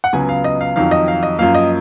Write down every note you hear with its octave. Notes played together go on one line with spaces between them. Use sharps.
F#5
C#2 C#3 F#3 B3 G#5
F5
D#5
F5
F2 D#3 F#3 F5
D#5
F5
D#5
F#2 F3 A#3 F5
D#5